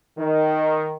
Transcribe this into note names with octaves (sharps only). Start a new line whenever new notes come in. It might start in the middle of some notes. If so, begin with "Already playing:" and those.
D#3